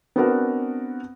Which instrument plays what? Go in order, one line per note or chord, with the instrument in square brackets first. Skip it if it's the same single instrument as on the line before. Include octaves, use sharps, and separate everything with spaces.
[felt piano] B3 C4 D4 F#4 A#4 F#5